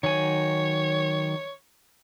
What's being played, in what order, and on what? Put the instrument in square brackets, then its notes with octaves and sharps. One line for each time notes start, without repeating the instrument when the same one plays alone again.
[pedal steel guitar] D#3 F#3 G#5 [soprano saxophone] C#5